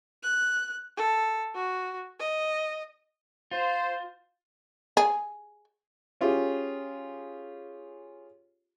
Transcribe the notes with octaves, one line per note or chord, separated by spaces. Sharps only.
F#6
A4
F#4
D#5
F4 C5
G#4
C#4 F4 G4 G#4